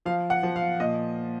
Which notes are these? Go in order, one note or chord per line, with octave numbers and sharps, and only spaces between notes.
F3 F5
F#5
F3
F5
A#2 D#5